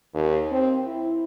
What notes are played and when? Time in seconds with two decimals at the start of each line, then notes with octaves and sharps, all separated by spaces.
0.14 D#2
0.52 C4
0.86 E4